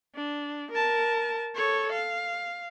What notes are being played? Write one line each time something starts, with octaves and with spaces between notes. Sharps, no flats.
D4
A#4 A5
A4 C#5
F5